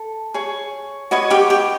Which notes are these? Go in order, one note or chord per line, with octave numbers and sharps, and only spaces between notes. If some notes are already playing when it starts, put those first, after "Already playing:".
Already playing: A4
G#4 C#5
F#4 B4 C#5 D#5 C#6
G4 G5
G4 G5